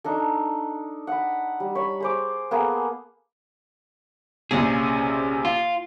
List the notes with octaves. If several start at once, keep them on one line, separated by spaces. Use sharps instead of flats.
D4 D#4 A4
F#5 B5
G3
C#5 B5
G#4 C5 D6
A#3 B3 G#4 A4
A#1 C3 C#4 G#4
F4